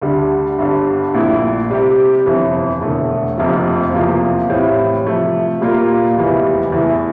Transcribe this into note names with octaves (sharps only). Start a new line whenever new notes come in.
D2 D3 G3
G1 G2 D3 G3
A#1 A#2 A3 E4
C3 G3 C4 G4
G1 F2 C3 E3
E1 E2 D3 A3
F1 F2 C3 F3 A#3
E2 C3 F3 A#3 F4
A2 E3 G3 C4
C3 F3 A3
A#2 G3 A#3 F4 A#4
F1 E2 E3 G3
E2 E3 A3